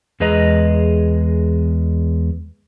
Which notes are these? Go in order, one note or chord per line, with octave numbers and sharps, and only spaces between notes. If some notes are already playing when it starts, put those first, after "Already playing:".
E2 G#3 G#4 B4 D#5 A#5